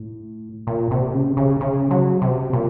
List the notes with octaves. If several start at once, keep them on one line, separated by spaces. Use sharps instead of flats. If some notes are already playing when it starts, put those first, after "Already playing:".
Already playing: A2
A#2
C3
C#3
C#3
C#3
F#3
C3
A#2